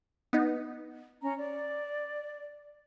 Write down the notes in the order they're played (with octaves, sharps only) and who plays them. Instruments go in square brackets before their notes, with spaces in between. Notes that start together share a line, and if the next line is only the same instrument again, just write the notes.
[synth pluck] B3 D#4
[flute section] C#4 A#5
D5